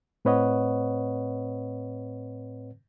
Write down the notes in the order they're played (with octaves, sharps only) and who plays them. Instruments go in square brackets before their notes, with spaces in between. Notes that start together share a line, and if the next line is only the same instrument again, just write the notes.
[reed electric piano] A2 C4 B4 C#5 D#5 F#5